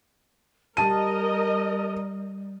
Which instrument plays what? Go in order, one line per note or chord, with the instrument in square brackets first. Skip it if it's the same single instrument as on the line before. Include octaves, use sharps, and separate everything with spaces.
[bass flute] G3 [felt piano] G4 A5 D#7 [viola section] A#4 D#5